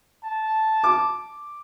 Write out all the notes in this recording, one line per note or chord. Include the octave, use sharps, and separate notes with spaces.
A5
D6